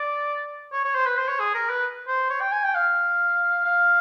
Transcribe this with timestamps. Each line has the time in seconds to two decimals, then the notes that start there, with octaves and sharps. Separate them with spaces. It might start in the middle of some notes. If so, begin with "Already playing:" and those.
Already playing: D5
0.72 C#5
0.85 C#5
0.95 C5
1.06 B4
1.17 C5
1.28 C#5
1.40 G#4
1.55 A#4
1.69 B4
2.08 C5
2.30 C#5
2.41 G5
2.52 G#5
2.64 G5
2.75 F5
3.65 F5